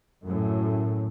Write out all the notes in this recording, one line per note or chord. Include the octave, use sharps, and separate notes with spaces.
F#2 A2